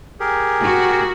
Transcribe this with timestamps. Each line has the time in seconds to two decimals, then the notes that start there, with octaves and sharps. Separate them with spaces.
0.20 G4 G#4 A#4
0.63 F#4